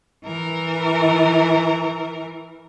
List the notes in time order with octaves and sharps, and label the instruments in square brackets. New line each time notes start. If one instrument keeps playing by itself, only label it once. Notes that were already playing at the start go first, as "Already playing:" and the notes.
[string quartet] E3 A#4